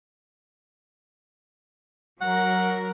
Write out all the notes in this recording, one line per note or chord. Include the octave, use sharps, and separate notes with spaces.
F#3 A#4 F#5